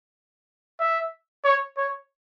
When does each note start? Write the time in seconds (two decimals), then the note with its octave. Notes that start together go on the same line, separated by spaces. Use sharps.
0.80 E5
1.45 C#5
1.77 C#5